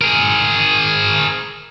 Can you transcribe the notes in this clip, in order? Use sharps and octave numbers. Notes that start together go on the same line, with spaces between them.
G#4 A#4